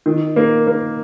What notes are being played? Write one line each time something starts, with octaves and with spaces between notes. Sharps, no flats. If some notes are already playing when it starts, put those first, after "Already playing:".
D#3
A#3
A#3